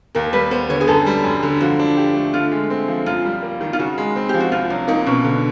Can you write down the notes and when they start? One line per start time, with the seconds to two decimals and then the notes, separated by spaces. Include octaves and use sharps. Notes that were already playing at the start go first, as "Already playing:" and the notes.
0.15 D#2 A#4
0.33 G3 B4
0.51 B3 C5
0.70 D3 C#5
0.81 G#4
0.87 F#2 A4
1.06 G3
1.24 F#2
1.43 D3
1.61 F3 F#4
1.79 D4
1.97 G4
2.15 A3
2.34 D3 F4
2.52 G#3
2.70 C4
2.88 F3
3.06 F#2 F4
3.25 G3
3.42 A#3
3.61 D#3
3.73 F4
3.79 C#3 F#4
3.98 G#3
4.16 C4
4.29 F3 G4
4.40 F#4
4.52 C2 F4
4.70 F#3 D4
4.88 A#3 D#4
5.06 B2 C#4
5.24 D3